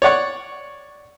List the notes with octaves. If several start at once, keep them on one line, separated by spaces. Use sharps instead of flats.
C#5 D5 F#5 C#6